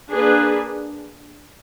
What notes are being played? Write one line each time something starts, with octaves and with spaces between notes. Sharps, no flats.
A#3 D4 G#4 B4